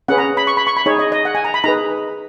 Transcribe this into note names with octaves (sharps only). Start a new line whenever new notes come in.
C#4 G#4 B4 F#5
A#5
B5
C#6
B5
C#6
B5
D#4 G#4 C#5
D#5
D#5
F#5
G#5
A#5
B5
D#4 G#4 B4 A#5